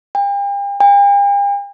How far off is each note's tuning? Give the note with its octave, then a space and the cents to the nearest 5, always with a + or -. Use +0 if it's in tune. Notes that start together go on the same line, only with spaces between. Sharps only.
G5 +40
G5 +45